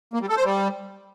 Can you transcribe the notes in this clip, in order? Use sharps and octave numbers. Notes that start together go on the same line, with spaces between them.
A#3
G3
A4
C5
G3